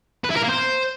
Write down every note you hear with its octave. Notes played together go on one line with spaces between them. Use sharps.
B4
E4
A#4
A#3
C5